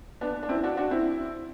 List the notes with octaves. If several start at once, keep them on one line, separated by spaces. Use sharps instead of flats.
B3 D4
D4
C4 E4
D4 F#4
D4 F#4
C4 E4